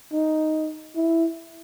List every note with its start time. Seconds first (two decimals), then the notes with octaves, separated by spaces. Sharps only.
0.12 D#4
0.96 E4